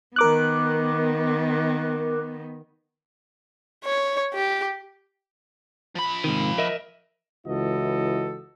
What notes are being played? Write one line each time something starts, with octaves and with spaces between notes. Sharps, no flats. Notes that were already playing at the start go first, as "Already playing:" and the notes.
D#3 B3 A#4 D6 F#6
C#5
G4
F3 B5
G#2 C3 D#3
A#4 D#5 E5
C#2 E3 E4 F#4 A4 D#5